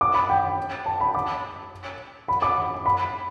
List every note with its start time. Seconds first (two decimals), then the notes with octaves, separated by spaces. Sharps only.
0.01 D6
0.14 B5
0.30 G5
0.86 A5
1.00 B5
1.15 D6
2.28 B5
2.42 D6
2.86 B5